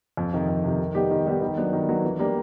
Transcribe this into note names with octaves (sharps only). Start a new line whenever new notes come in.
F2
C3 D#3
F2
C3 D#3
D#3
G3 B3 D#4 G4
D#3
G3 B3 D#4 G4
D#3
F#3 B3 D4
D#3
F#3 B3 D4
E3
G3 A#3 D4 G4